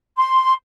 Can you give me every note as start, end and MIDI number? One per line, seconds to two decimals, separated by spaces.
0.17 0.52 84